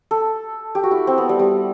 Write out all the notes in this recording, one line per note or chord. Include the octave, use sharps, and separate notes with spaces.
A4
G4
F#4
E4
C4
B3
G3
G3